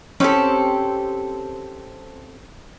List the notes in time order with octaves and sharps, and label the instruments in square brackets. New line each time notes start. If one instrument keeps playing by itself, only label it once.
[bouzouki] C4 G4 A4 [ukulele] C#4